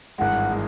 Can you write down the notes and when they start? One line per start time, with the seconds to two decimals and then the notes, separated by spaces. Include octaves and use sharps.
0.18 G#1 G2 E3 G#3 F#5
0.52 E3 G#3